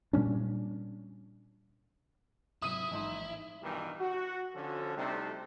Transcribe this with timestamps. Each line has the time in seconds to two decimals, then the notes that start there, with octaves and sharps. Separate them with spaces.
0.13 A#2 G3 C#4 D4
2.62 G#2 C3 F#3 E4 D#6 D#7
2.91 A1 G#2 F3 D#4 C6
3.63 G2 B2 D#3 E3 G3
4.00 F#4
4.55 D3 F3 C#4 F#4 A4
4.97 C3 G3 A3 C4 D4 D#4